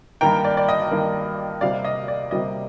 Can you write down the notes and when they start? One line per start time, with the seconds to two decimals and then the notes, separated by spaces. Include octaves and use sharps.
0.21 G2 D#3 A#3 G5 A#5
0.45 D5
0.57 D5
0.69 D#5
0.91 G2 D#3 A#3
1.61 C3 G3 A#3 D5 F5
1.85 D#5
2.08 D5
2.31 C3 G3 A#3 D#5